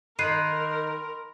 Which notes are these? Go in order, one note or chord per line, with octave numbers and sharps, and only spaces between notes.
D#3 A#4 B5 C6 F#6 C7 D#7